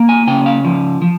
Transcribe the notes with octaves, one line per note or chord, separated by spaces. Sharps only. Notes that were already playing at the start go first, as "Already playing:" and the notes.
Already playing: A#3
G#5
C#3 G5
F5
F3
F3